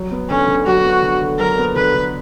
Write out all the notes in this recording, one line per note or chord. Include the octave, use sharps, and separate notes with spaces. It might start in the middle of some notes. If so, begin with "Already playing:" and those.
Already playing: F#3
B3
D3 C#4
D3
F#3 F#4
B3
D3
D3
F#3 A#4
B3
D3 B4
D3